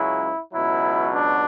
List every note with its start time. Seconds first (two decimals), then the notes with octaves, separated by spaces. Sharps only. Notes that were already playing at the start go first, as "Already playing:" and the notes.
Already playing: C#2 C#3 F#3 E4
0.53 C#2 B2 F#3 E4
1.14 D4